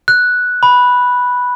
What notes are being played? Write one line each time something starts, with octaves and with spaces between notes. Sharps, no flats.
F#6
B5